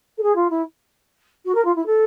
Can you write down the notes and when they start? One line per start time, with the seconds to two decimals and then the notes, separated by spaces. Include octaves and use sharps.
0.17 A4
0.23 G#4
0.35 F4
0.50 E4
1.45 F#4
1.54 A#4
1.65 F4
1.75 E4
1.86 A4